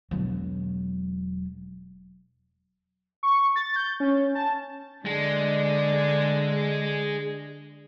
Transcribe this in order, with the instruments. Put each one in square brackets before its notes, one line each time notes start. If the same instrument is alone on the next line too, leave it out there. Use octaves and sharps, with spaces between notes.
[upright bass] E1 F#3
[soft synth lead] C#6
A6
G6
C#4
A5
[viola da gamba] D3 D4 [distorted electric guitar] G#3